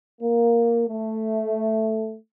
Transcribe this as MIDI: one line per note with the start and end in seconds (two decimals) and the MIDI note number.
0.21 0.86 58
0.88 2.16 57